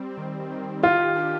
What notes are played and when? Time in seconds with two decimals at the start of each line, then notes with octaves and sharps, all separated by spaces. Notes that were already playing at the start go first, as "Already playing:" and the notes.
Already playing: G3 C4
0.18 D#3
0.51 D#3
0.83 F4 G4
1.16 D4